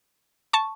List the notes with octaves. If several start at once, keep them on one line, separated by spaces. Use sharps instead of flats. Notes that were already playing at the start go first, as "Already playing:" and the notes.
A5 C#6